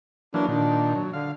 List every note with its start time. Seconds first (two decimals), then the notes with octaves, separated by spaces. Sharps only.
0.34 E3 F#3 A#3 D4
0.48 A#2 D#3 D4
0.95 F#3
1.13 D3 F5